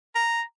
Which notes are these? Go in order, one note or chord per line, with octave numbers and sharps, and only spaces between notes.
A#5